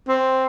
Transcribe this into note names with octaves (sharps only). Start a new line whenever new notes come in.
C4